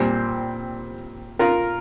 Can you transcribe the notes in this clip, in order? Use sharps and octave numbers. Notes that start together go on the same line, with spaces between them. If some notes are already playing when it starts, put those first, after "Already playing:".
Already playing: A#2 G3 C4 C5
F4 A#4